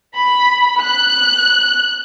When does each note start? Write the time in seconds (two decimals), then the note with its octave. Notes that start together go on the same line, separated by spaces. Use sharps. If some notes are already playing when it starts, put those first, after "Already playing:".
0.16 B5
0.80 F#6